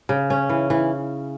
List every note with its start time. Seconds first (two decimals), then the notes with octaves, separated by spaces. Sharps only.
0.09 C#3
0.30 C#4
0.49 E3
0.70 E3